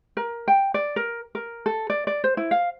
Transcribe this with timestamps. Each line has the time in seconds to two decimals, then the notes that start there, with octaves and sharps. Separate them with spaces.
0.17 A#4
0.48 G5
0.74 D5
0.96 A#4
1.35 A#4
1.66 A4
1.90 D5
2.07 D5
2.24 C5
2.37 E4
2.51 F5